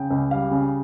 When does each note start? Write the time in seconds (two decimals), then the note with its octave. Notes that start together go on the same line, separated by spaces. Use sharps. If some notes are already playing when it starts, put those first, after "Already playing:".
Already playing: C#3 G5
0.11 C#2
0.31 G3 F5
0.51 C#3